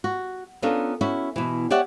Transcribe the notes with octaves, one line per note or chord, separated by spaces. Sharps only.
F#4
B3 C#4 D4 F4 A4 A#4
C#4 E4 F#4
B2 E3
G4 C#5 D5 E5 F#5